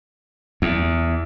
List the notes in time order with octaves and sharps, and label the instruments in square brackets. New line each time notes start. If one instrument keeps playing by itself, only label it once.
[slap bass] E2